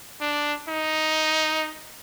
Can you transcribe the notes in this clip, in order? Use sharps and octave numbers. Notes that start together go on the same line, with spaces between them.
D4
D#4